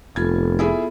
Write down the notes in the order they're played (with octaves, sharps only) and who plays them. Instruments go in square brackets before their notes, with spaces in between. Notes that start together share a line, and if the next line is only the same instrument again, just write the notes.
[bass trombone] F1 [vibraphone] B3 F4 A4 [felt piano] G#6
[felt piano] E4 G#4 E5